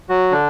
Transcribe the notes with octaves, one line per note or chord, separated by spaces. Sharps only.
F#3 F#4
D3 D4